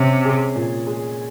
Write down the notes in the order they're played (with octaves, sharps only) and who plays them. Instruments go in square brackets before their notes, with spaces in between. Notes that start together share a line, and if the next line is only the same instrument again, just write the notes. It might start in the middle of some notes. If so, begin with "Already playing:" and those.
Already playing: [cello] C3 [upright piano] C#4
[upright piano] G#4
A#2
G#3